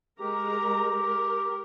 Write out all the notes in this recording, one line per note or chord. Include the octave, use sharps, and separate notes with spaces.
G#3 G4 A#4 A#5
A#4